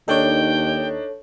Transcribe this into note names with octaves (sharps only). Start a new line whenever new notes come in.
D#2 D4 D#4 A4 C#5 G5